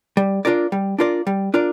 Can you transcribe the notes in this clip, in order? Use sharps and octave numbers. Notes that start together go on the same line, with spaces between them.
G3
D4 F4 A#4 D5
G3
D4 F4 A#4 D5
G3
D4 F4 A#4 D5